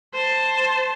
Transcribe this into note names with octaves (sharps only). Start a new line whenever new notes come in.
C5 A5